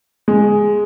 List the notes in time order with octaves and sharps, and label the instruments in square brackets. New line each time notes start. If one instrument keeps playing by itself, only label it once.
[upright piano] G#3